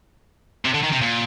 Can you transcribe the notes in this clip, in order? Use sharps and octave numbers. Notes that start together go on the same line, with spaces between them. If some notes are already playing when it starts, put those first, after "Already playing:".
C3
D3
D#3
C3
A#2